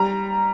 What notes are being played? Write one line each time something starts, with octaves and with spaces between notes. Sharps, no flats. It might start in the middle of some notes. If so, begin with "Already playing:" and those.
Already playing: G3 A#5